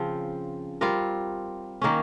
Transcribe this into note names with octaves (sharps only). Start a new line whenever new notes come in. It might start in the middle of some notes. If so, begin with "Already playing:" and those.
Already playing: C#3 F3 C4
G3 C4 F4 A#4
D#3 A#3 C#4